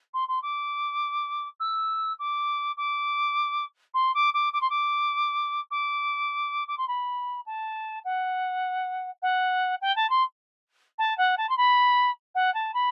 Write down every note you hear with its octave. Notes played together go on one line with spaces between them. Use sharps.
C6
C6
D6
E6
D6
D6
C6
D6
D6
D6
C6
D6
D6
D6
C6
B5
A5
F#5
F#5
G5
A5
C6
A5
F#5
A5
C6
B5
F#5
A5
B5